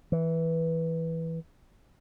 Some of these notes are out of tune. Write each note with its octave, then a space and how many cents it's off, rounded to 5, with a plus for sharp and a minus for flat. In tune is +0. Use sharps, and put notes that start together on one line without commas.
E3 -10